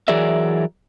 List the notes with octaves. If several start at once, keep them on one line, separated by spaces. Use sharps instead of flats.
E3 F#3 G#4 A#4 D5 E5